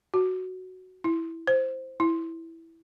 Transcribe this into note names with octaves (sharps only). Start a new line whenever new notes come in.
F#4
E4
C5
E4